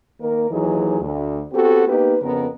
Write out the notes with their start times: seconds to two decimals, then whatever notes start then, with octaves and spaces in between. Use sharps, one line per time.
0.21 D#3 A#3 A#4
0.51 D#2 E3 F#3 D#4 G#4
1.01 D2
1.53 B3 C4 F#4 G4 A4
1.87 A#3 B3 D#4 G4 B4
2.22 F2 C#3 B3 A#4